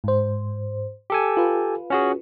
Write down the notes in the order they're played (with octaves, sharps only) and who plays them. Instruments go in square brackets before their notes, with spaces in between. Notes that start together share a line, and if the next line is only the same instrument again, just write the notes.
[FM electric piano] G#2 C5
[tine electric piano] G4 A4 G#5
[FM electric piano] F4 B4
[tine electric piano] C#4 F#4 G#4